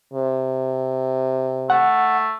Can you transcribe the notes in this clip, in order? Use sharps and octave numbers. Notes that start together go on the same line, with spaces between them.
C3
A3 F#5